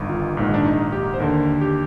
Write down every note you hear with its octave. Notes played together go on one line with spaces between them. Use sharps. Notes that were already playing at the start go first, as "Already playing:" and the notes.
Already playing: G1 G2 D#3
F4
A#1 G#2 D#3
D4
D#4
G4
C5
D#2 D3 A#4
G4